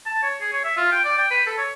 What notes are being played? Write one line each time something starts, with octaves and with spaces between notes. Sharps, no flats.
A5
C#5
G#4
C#5
E5
F4
G5
D5
G5
B4
A4
C#5